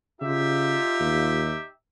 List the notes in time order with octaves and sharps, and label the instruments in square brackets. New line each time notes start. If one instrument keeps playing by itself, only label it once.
[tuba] C#3 [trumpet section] D#4 G4 E5 [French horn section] F4
[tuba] D#2